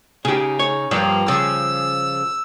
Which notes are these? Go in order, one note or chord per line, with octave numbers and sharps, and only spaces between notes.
C#3 D#4 G4 G#4
C#5
G2 F3 A#3
C#3 F3 E6